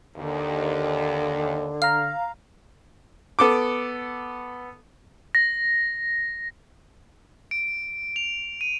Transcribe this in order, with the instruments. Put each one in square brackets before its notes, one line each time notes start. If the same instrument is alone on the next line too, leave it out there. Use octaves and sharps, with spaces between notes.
[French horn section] D#2 [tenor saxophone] D3
[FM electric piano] F5 A#5 [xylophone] F6
[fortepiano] B3 A4 D6
[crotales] A#6
D7
F7
D#7